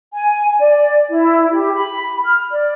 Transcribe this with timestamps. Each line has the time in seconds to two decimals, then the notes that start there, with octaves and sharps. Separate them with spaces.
0.13 G#5
0.60 D5
1.10 E4
1.52 G4
1.75 B5
2.04 B5
2.25 F6
2.51 D5